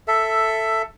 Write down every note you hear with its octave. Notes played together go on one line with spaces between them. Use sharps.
A4 E5